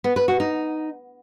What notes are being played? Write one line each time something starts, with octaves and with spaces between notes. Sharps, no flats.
B3
B4
F#4
D#4